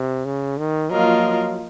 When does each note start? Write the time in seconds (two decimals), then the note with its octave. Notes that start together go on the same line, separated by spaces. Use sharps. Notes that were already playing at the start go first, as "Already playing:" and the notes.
Already playing: C3
0.26 C#3
0.58 D#3
0.90 F3 F#3 A#3 F4 A#4 D#5